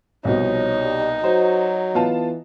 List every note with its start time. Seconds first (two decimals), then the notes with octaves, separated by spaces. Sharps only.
0.25 C2 B2 F3 D#4 C#5
0.81 G3
1.24 F#3 F#4 C5
1.94 E3 B3 F4 A5